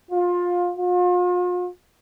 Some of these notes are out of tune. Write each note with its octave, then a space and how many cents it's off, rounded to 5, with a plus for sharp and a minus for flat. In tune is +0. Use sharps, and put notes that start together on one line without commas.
F4 +20
F4 +40